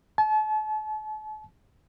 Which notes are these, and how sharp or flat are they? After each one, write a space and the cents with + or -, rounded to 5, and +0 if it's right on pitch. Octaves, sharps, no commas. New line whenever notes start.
A5 -40